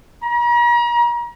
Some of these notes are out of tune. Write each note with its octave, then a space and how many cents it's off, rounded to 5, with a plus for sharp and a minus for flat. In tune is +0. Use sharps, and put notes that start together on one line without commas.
A#5 +40